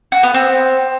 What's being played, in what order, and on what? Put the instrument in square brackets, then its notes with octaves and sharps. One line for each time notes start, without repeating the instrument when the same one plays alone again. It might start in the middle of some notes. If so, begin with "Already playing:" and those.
[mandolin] F#4
B3
C4